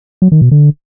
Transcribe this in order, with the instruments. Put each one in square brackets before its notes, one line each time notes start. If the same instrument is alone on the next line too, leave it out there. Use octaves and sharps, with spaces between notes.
[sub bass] F#3
D#3
B2
D3